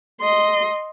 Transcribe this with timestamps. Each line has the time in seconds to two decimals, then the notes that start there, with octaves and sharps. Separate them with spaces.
0.21 D#5 C6